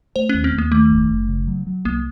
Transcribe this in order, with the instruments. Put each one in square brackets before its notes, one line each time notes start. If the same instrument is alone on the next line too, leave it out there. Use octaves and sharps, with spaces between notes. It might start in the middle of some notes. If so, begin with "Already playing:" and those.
[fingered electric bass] A3 [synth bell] C5
[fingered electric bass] D#2 [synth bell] C#4
[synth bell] C4
[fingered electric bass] D#2 [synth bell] A#3
[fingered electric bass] D#3 [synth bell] A3
[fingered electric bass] F#1
F#1
C#3
F#3
F#3
[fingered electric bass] C2 [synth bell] A#3